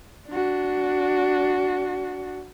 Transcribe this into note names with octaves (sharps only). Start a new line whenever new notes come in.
D4 F#4